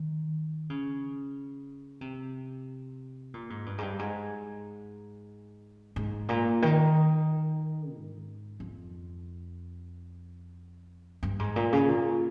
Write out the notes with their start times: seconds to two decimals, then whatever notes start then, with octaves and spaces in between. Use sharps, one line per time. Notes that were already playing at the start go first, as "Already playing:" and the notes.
Already playing: D#3
0.70 C#3
2.01 C3
3.34 A#2
3.50 G#2
3.66 G2
3.78 G#2
3.83 G2
3.99 G#2
5.96 G#2
6.29 A#2
6.62 D#3
7.94 G#2
8.60 F2
11.23 G2
11.39 G#2
11.56 A#2
11.73 C#3
11.89 A#2